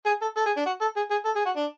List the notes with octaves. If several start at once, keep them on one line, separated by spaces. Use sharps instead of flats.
G#4
A4
A4
G#4
D4
F#4
A4
G#4
G#4
A4
G#4
F#4
D4